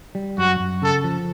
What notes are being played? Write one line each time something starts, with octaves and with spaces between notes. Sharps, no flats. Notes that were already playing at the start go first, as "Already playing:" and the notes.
G3
F#2 F#4
F#2
C#3 A4
F3